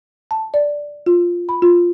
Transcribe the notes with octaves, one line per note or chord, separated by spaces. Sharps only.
A5
D5
F4
B5
F4